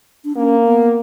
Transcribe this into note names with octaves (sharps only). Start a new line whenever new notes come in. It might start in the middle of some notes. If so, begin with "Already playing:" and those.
D4
A#3 C#4
B3